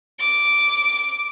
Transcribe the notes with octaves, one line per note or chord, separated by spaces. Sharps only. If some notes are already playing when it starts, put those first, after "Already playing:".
D6